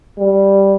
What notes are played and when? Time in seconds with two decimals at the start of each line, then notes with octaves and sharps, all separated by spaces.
0.18 G3